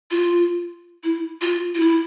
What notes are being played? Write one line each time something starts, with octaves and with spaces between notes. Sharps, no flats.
F4
E4
F4
F4
E4